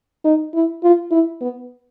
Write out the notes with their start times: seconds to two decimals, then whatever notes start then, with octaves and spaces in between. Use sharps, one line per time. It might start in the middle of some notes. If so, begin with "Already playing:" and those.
0.25 D#4
0.54 E4
0.83 F4
1.11 E4
1.41 B3